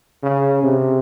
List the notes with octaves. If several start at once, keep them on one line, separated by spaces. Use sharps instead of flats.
C#3
C3